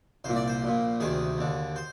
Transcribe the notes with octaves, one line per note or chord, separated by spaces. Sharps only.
C2 A#2 C5
D5
C5
A#1 A#2
D2 C3 D#3 G#4
D#2 D3
C5